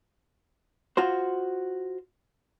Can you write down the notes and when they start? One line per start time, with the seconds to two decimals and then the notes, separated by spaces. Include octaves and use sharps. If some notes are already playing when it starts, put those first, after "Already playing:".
0.97 F4 F#4 C5